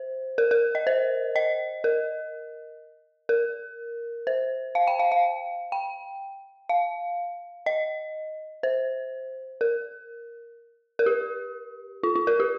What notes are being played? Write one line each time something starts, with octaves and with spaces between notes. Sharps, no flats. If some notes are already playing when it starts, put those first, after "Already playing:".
Already playing: C5
A#4
A#4
D#5
C5
D#5
A#4
A#4
C5
F5
G5
F5
F5
G5
F5
D#5
C5
A#4
A#4
G4
F4
F4
A#4
G4